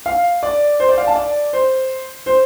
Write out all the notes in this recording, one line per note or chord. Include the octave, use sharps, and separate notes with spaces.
F5
D5
C5
D5
F5
A5
D5
C5
C5